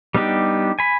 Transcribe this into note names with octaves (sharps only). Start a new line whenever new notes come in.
G3 B3 D4 D#4 G4
G#5 B5